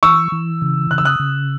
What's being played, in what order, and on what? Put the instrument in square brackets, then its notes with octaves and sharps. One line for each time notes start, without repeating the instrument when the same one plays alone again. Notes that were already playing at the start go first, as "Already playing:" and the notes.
[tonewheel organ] E3 [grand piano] C#6 E6
[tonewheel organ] E3
C#3
[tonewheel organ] C#3 [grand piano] F#6
[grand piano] E6
D#6 F#6
[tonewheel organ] C#3